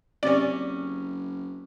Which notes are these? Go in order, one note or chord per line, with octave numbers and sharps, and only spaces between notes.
F#1 C3 C#4 D5